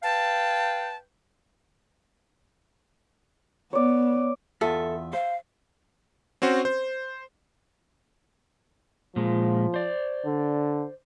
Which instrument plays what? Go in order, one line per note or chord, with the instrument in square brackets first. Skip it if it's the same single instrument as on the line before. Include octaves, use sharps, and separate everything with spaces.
[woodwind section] B4 F5 G5 A5
[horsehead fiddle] B3 [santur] C#5 D5
[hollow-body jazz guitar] E2 F4 [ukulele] A4 [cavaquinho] E5
[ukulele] C5 [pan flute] F5
[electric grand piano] C4 C#4 F#4 C5
C5
[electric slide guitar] A#2 G#3 [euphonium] F3
[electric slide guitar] C5 D5
[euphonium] D3